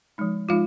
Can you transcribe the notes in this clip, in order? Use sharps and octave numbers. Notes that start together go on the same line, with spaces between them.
F3 G#3 D#4
F3 G#3 D#4 F4 F5